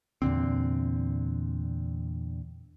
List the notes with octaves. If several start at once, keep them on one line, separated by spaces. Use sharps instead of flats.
E2 A#2 D3 C4